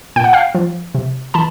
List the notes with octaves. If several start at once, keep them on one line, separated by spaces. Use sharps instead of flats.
A#2 G5
F#5
F5 G5
F3
C3
E3 A5 B5